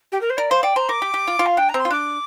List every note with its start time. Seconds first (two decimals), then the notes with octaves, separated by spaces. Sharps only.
0.12 G4
0.21 A#4
0.30 C5
0.37 A#4 D5
0.50 C5 F5
0.63 D5 G5
0.76 C5 A#5
0.88 A#4 D6
1.02 G4
1.14 G4
1.28 F4
1.39 F4
1.46 F5
1.57 D4 G5
1.69 A#5
1.74 C4
1.79 C6
1.85 F4
1.91 D4 D6